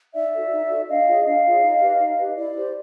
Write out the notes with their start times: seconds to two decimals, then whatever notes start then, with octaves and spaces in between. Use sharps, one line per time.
0.14 D#4 D5 E5
0.33 F#4 A4
0.51 D#4
0.70 F#4 A4
0.89 D4 D#5 F5
1.07 F4 G#4 C#5
1.25 D4 D#5 F5
1.45 F4 G#4 C#5
1.62 D#4
1.81 G4 B4
2.00 D#4
2.18 G4 B4
2.36 E4 D5
2.56 G4 C5